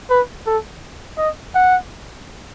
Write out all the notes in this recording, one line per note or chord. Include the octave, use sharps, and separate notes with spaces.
B4
A4
D#5
F#5